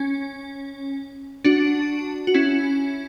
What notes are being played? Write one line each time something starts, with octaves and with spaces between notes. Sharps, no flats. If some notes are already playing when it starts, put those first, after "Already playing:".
Already playing: C#4
D4 F#4
F#4
C#4 E4